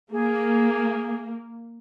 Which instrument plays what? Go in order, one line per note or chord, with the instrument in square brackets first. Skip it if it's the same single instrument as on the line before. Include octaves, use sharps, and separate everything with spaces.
[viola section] A#3 [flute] G#4